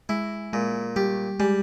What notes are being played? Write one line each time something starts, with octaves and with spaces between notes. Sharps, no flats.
G#3 E4
A#2 G#3
G3 G4
G3 G#3